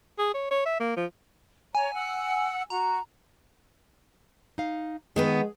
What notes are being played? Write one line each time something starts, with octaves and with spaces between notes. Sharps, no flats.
G#4
C#5
C#5
E5
A#3
F3
C#5 G#5 A#5
F#5 E6
F#4 A#5
D#4 F5
D#3 G#3 B3 G#4 B4